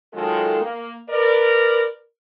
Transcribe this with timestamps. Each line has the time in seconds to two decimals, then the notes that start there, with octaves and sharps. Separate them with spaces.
0.13 D#3 F#3 G#3 F4 A4
0.61 A#3
1.10 A#4 B4 D5